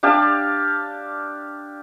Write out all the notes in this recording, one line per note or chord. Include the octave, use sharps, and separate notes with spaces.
D4 G4 F5 A5